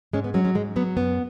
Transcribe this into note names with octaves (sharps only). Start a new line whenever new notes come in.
G#2 G#3 C#4
B3
F#3 G#3 C#4
G#3 C#4
G#2 G#3
F#3 B3
F#2 B3